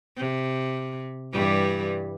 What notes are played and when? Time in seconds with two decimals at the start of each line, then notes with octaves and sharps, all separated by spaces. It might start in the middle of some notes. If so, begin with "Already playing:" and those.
0.17 C3
1.32 G2 E3 G3